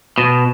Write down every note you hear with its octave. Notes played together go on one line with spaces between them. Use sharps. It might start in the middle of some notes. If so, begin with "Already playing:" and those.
B2